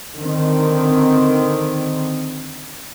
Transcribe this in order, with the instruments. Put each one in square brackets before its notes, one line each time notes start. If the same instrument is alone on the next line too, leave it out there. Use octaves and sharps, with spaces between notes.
[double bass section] D3 D#3 C4